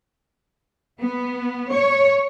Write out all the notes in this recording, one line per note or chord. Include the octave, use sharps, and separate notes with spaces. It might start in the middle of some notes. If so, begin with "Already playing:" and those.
B3
C#5